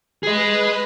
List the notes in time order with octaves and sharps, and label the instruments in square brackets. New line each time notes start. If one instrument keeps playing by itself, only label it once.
[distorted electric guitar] G#4 D#5 [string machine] B4